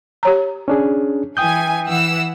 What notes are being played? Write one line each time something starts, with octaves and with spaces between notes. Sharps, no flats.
G4 C#5 A#5
C#4 D4 G#4
E3 G5 G#5 D#6 G6
E3 F#5 E6